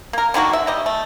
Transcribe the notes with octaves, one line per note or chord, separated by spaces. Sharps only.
A#3 A#4
D3 D#3 A#3 F#4
E5
G3 G4 D#5
A3